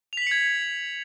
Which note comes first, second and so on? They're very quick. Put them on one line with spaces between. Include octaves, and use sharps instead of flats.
F7 B6 F#7 C#7 G#6